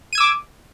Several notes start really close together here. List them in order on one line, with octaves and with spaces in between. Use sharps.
D#7 G#6 E6 D6